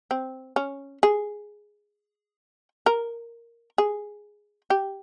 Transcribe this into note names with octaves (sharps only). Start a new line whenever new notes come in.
C4
C#4
G#4
A#4
G#4
G4